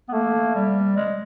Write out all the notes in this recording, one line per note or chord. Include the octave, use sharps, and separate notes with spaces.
B3
A3 A#3
G3
G#3